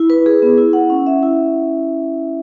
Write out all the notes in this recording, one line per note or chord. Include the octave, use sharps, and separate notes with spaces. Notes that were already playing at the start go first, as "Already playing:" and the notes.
Already playing: E4
B4
G#4
B3
E4
F#5
C#4
E5
E4